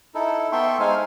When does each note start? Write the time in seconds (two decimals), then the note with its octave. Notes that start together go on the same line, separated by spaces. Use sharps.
0.15 D#4 E4 A4
0.52 B3 A4 E5 G5 C6 C#6
0.80 G#3 D#4 C5 F5 G#5